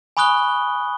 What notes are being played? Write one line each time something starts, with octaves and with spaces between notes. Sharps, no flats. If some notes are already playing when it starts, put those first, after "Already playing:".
G#5 B5 C#6 D#6 F#6 G7